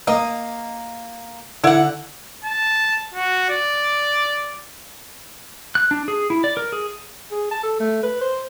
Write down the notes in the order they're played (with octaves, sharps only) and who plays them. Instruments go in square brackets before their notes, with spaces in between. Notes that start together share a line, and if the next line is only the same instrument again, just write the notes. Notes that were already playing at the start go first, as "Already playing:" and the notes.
[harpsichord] A#3 [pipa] D#5
[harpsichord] D3 [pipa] E4 F#5
[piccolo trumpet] A5
F#4
D5
[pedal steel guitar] F#6
D4
G#4
E4
D5
A#4
G#4
[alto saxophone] G#4
A5
A4
A3
B4
C5